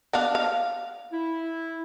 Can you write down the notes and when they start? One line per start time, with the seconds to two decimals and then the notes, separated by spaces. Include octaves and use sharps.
0.13 B3 D4 F5
0.35 F5
1.13 E4